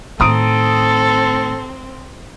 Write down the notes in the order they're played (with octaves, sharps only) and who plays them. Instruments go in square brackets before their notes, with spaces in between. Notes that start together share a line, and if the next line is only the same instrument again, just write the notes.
[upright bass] A2 D#3 [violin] C4 [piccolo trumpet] A4 [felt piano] A#5 D#6 D7